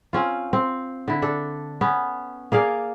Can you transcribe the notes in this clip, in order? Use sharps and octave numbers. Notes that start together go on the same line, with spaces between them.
C4 C#4 F4
C4
D3 E4
D4 A4
B3 C#4
A#3 G#4 D5 F5